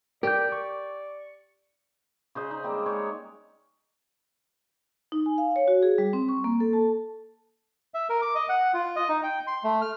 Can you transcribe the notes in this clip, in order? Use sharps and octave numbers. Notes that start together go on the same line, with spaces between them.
G4 A#4 D5 G6
C#6
C#3 C5 D#5
D#4
G3 G#3 A#3 C4
G#3 C#5
D#4
G#5
F5
C#5
F#4
G#4
G3
C4
C#6
A#3
A4
A5
E5
A#4
D6
D#5
F#5
F4
D#5
D#4
G5
C6
A3
F6